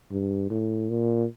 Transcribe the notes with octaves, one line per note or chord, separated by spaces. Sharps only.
G2
A2
A#2